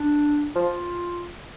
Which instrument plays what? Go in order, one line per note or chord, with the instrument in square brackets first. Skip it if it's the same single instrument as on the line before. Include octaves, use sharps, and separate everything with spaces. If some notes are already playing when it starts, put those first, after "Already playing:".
Already playing: [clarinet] D4
[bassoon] F3 [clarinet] F4